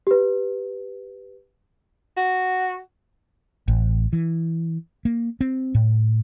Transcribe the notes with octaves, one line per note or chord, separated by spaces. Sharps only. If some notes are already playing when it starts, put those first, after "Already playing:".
G4 B4
F#4
A1
E3
A#3
C4
A2